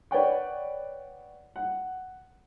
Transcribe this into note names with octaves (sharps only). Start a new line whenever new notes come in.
B4 C#5 D5 F#5 G5 C#6
F#5